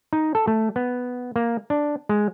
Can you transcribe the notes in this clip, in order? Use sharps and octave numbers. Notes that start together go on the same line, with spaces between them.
D#4
A4
A3
B3
A#3
D4
G#3